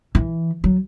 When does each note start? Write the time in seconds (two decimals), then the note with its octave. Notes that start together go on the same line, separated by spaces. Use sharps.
0.15 E3
0.64 F#3